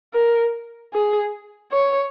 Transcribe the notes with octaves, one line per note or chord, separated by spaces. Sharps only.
A#4
G#4
C#5